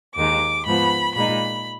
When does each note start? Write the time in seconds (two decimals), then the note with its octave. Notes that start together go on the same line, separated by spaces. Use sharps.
0.16 D#2 D#3 G#3 D6
0.66 G#2 F3 B3 B5
1.15 A#2 G#3 D#4 B5